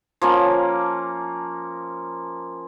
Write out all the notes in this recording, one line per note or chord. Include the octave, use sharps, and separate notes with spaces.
F3 A#3 C#4